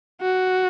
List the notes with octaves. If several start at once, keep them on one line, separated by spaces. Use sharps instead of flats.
F#4